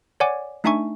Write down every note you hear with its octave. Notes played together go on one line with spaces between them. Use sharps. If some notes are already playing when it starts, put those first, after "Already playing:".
C#5 D5 F#5 G#5 D6
A3 D4 D#4 E5 G#5 C#6